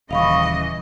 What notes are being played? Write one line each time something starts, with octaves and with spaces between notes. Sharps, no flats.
D#1 C#3 E3 D#5 F5 B5 C#6